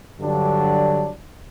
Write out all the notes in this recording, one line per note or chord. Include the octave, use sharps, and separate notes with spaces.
G2 D3 F#3 D4